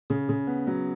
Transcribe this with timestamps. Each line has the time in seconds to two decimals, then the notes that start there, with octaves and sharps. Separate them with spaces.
0.10 C#3
0.29 C#3
0.47 B3
0.67 F#3